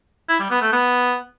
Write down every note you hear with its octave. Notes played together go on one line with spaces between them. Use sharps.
E4
G3
B3
A3
B3